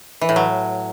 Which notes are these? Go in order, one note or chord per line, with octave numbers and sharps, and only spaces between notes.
E3
A2
F#3